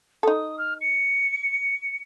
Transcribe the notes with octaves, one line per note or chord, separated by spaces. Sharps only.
D#4 A4 D#6
F6
C#7